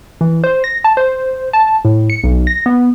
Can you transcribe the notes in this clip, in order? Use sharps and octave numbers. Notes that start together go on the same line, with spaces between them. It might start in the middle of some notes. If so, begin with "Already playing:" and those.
E3
C5
A#6
A5
C5
A5
A2
C#7
B1
A#6
B3